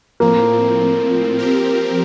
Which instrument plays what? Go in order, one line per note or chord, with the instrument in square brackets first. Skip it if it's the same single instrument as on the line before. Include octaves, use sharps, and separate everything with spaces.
[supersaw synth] A2 F3 C4 [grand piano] A#3
[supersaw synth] F3 C4 G4 A#4